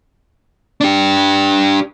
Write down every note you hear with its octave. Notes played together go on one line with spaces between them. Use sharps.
D4 G4